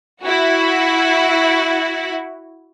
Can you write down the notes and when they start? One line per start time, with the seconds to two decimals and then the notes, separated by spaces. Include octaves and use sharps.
0.22 E4 F#4